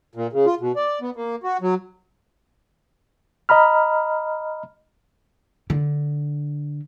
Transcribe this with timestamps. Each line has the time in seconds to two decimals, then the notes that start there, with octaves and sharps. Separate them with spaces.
0.15 A#2
0.33 C#3
0.46 F4
0.60 B2
0.76 D5
1.01 B3
1.16 A#3
1.43 F#4
1.61 F#3
3.49 D#5 A#5 B5 F6
5.70 D3